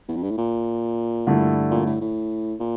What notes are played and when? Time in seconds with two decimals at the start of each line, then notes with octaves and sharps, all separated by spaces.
0.08 E2
0.16 F2
0.23 G2
0.31 A2
0.38 A#2
1.27 G2 D3 A3 E4
1.71 A#2
1.86 A2
2.01 A2
2.60 A#2